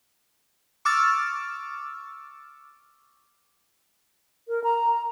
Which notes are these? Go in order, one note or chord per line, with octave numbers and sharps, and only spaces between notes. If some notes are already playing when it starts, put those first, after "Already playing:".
C#6 D6 E6 F6 A6
A#4
A#5